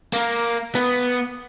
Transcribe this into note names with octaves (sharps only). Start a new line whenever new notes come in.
A#3
B3